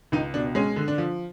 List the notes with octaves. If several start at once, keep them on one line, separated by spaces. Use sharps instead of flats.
C#2 D#4
B2 D4
G#3 C#4
D3
D4
F3